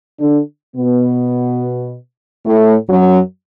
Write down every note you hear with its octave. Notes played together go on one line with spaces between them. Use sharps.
D3 D4
B2 B3
A2 A3
F#2 F#3